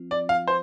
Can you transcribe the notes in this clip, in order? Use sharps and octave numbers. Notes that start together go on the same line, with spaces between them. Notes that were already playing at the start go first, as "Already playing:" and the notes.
Already playing: F3 C4 F4
D5
F5
C5